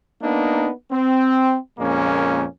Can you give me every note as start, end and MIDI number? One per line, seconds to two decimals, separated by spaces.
0.22 0.69 58
0.22 0.69 59
0.22 0.69 62
0.22 0.69 63
0.90 1.55 60
1.79 2.44 41
1.79 2.44 46
1.79 2.44 56
1.79 2.44 58
1.79 2.44 61